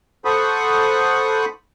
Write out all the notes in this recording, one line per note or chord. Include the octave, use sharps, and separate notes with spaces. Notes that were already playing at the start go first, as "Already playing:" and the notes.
A4 C5 F#5 B5 C#6 D#6